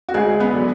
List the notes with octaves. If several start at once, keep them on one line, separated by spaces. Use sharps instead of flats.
F#4
D2 G#3 G#4
B3 B4
D3 F#3